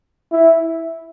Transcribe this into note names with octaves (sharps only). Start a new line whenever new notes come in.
E4